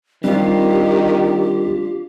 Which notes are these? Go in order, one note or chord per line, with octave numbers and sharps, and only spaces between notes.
D#3 G3 C4 D4 F4 G4